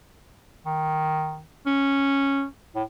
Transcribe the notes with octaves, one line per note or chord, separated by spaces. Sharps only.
D#3
C#4
A2